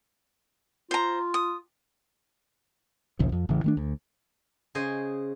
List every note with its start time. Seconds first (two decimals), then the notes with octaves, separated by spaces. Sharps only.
0.91 F4 C5 A#5
1.34 D#6
3.19 A#1 D#2 C#3 F3
3.32 F2
3.49 A1 C#3 E3
3.64 D#3 A3 D4
3.77 D2
4.75 C#3 C5 D#5 G#5